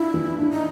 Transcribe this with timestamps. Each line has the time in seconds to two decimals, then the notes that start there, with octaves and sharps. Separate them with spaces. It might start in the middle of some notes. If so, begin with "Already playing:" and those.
Already playing: D4 E4 F4
0.14 E3
0.39 D4
0.51 D#4